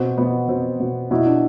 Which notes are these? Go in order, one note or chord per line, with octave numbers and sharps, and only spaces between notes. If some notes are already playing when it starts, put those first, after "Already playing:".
Already playing: B2 C4
B2 B3
B2 C4
B2
B2 E4
D4